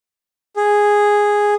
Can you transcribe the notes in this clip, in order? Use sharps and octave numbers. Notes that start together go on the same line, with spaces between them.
G#4